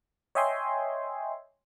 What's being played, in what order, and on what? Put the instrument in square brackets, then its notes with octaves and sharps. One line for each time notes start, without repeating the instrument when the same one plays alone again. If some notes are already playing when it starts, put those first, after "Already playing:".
[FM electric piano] C#5 D#5 E5 G5 G#5 C6